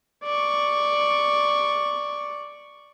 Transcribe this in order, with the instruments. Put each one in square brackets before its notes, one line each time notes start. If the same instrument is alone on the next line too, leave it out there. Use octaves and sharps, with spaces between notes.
[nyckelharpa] D5 C#6